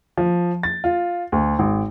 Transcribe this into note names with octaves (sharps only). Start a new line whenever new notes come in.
F3
A6
F4
D2
G#1